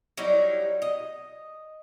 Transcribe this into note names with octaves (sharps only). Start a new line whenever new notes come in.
F#3 G3 D#4 E4
D#5